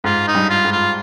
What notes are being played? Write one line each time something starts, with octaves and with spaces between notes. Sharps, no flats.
G#2 F4
D#4
G2
F4
G#2
F4